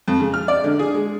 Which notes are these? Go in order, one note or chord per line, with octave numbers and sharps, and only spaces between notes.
F2
C#3
F6
D5
D3
G#4
G#3